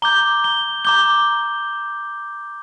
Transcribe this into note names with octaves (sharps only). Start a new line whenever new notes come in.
A#5 D6 G6 G7
G7
A#5 D6 G6 G7